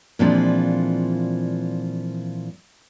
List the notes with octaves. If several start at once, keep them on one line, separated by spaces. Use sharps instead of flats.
A#2 E3 F3 G#3 C4 D4